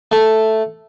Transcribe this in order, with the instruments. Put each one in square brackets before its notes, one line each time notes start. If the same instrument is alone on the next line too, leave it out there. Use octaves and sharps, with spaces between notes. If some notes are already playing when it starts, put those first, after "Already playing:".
[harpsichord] A3